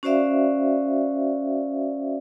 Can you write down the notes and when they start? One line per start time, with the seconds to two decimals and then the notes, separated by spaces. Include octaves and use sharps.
0.03 C#4 F#4 C5 D5 E5 F5